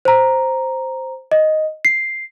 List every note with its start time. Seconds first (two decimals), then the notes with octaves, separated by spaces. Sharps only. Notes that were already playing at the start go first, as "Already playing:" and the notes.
0.05 C5 A#5
1.32 D#5
1.85 C7